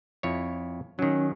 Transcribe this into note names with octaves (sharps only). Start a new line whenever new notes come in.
F2 E4 C#5
D#3 F#3 C#4